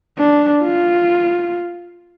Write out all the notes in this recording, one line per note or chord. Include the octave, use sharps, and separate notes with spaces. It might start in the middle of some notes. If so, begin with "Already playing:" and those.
D4
F4